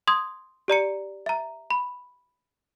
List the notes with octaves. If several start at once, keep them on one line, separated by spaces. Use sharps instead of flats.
C6 D#6 G#6
G4 D5 A#5 C#7
E5 A#5
B5